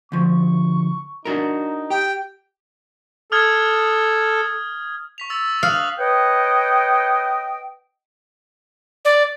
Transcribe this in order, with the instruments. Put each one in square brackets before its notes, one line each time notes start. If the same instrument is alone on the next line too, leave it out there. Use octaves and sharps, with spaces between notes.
[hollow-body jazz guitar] D2 F3 [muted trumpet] C#6
[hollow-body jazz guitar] D4 F#4 A#4 [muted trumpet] D#4
[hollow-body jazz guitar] G4 [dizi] G5
[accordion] A4 [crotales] D#6 F6 G#6
[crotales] C#6 B6 F7
E6 A6
[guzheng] F5 [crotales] D#6 F#6 F#7
[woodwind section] B4 C#5 D#5 G5
[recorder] D5